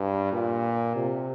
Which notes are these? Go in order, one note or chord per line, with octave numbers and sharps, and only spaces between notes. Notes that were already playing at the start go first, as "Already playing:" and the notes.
Already playing: G2
A#2
C3